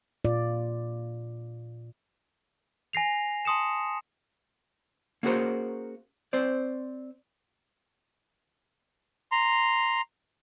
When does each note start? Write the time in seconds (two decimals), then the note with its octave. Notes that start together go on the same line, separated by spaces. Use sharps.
0.25 A#2 F4 D5
2.93 G#5 A#6 C7 F7
3.45 A5 C6 D#6 C#7 E7
5.23 A#3 C#4 F#4 G#4 A#4 C5
6.33 C4 C5 D5
9.32 A#5 C6